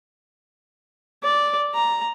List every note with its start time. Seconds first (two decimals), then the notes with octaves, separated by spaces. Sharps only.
1.23 D5
1.74 A#5